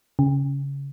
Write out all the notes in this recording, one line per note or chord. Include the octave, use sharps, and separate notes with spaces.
C#3